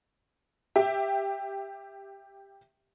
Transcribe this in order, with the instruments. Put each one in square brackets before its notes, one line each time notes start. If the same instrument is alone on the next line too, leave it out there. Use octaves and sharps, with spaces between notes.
[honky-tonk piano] G4 E5 G5